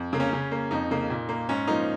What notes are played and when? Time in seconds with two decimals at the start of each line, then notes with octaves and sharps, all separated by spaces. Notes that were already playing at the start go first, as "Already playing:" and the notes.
Already playing: F2
0.13 C#3 A#3
0.20 C#4
0.33 C#3
0.52 A#3
0.71 F2 D#4
0.91 C#3 A#3
1.10 A#2
1.29 A#3
1.49 G#2 C#4
1.67 F3 A#3 D#4